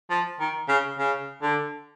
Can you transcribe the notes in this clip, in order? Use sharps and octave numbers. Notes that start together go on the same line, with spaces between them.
F3
D#3
C#3
C#3
D3